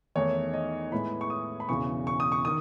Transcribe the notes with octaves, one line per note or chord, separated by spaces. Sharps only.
E2 D#3 A3 D#4 C#5
D#5
A2 G#3 B3 E4 B5
C#6
D#6
B5
E1 E2 C#3 E3 C#6
C#6
D#6
C#6
D#3 D#6